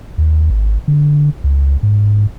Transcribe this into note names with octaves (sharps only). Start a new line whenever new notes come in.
D#2
G#1
D3
C#2
G#2